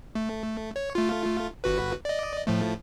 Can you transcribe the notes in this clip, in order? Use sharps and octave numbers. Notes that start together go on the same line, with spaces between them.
A3
C#5
A3 F4
G1 F#4 B4
D5 D#5
A2 F3 A3